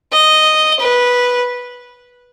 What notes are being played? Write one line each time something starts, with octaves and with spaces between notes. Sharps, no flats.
D#5
B4